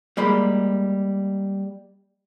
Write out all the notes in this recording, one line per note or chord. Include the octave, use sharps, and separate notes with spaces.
G3 G#3 A#3 B5